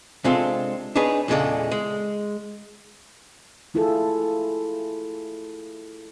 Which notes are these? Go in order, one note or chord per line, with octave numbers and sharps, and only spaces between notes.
C3 G#3 C4 D4 F4 A4
D4 D#4 G#4 B4 C#5
E2 A#2 C#3 G#3 A4 D5
G#3
A3 E4 F4 G#4 A4